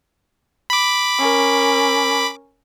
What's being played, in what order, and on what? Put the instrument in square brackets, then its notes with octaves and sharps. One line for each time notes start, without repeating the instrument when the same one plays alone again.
[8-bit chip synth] B5 D6
[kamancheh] C#4 A#4